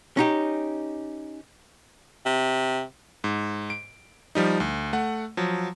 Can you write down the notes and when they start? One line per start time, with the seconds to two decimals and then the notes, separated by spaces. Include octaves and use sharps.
0.17 C#4 D#4 G4
2.26 C3
3.24 G#2
3.70 D7
4.35 F3 G3 D#4
4.60 D2
4.93 A3 F#5
5.37 F3 F#3